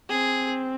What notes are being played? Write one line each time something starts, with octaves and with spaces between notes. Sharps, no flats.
C4 G#4